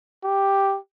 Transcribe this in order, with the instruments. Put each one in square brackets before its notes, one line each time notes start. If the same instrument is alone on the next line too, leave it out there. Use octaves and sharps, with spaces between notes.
[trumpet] G4